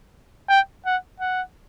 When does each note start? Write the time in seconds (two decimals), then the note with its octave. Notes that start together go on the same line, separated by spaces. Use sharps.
0.49 G5
0.86 F#5
1.20 F#5